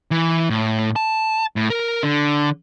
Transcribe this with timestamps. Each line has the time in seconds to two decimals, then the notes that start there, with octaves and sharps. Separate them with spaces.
0.11 E3
0.50 A2
0.96 A5
1.56 A2
1.70 A#4
2.03 D3